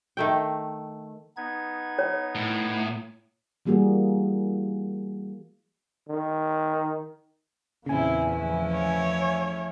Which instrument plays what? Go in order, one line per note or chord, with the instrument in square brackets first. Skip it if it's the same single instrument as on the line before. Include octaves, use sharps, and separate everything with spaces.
[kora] D#3 A3 G5
[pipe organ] B3 D#4 G#6
[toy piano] C#5
[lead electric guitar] A2
[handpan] E3 G3 A#3 F#4 G#4
[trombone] D#3
[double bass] E2 [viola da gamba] A#2 C4 E4 [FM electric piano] C#3 G#5
[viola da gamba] F3 A3 E4
[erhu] C#5